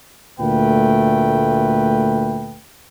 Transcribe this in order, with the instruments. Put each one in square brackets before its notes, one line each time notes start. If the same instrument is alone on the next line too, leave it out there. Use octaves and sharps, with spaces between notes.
[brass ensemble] D2 A#2 A3 B4 G5